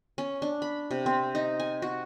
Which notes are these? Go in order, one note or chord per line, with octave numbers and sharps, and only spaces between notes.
C#4
D4
B5
C3
C4
D#4
G#5
F#4